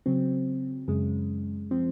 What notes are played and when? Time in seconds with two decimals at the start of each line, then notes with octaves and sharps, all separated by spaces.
0.06 C#3 F#3 C4
0.88 F#2 C#3 G#3
1.71 F3 C4